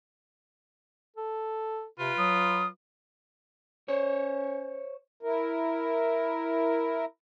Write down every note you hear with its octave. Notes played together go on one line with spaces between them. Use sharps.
A4
C3 F4 B4
F#3 D#6
C#4 C5 C#5
E4 A#4